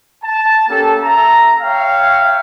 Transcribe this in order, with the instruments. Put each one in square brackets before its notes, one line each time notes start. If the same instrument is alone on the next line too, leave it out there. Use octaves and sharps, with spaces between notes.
[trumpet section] A5
A#3 C#4 G4 A4 A5
E5 A#5
C#5 E5 F5 G5